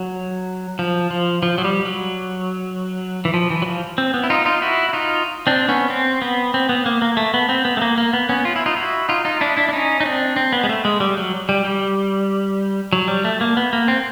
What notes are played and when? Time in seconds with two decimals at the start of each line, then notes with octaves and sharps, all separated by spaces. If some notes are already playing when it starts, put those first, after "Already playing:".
Already playing: F#3
0.79 F3
1.11 F3
1.43 F3
1.58 F#3
1.64 G3
1.85 F#3
3.25 E3
3.34 F3
3.50 E3
3.62 F#3
3.66 F3
3.98 C4
4.14 B3
4.24 E4
4.30 D#4 F4
4.46 D#4 F4
4.62 E4 F#4
4.89 E4
4.93 D#4 F4
5.47 C4 D4
5.68 B3 C#4
5.90 C4
6.22 B3
6.54 C4
6.69 B3
6.86 A#3
7.02 A#3
7.17 A3
7.34 B3
7.49 C4
7.65 B3
7.77 A3
7.82 A#3
7.98 A#3
8.13 B3
8.29 B3 C#4
8.45 F4
8.56 E4
8.66 D#4 F4
8.77 E4 F#4
9.09 D#4 F4
9.25 D#4 F4
9.41 D4 E4
9.57 D4 E4
9.69 D4
9.73 C#4 D#4
10.00 D#4
10.05 C4 D4
10.36 C4
10.53 B3
10.63 G#3
10.69 A3
10.85 G#3
11.00 G3
11.17 F#3
11.49 G3
11.65 G3
12.93 F#3
13.08 G3
13.25 A3
13.41 A#3
13.57 B3
13.73 A#3
13.88 C4